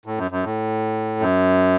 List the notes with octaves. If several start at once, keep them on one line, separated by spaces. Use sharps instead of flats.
A2
F#2
F#2
A2
F#2